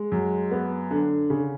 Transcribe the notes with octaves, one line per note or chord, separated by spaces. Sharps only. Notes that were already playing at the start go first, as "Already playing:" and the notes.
Already playing: G#3
F#2
B3
D3
C#3